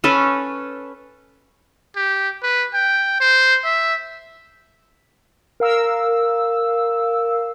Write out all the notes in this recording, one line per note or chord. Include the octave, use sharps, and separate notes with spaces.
C#4 A4 B4
G4
B4
G5
C5
E5
A#4 F5 E6